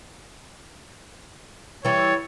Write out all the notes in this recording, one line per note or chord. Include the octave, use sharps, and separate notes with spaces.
E3 G3 C#5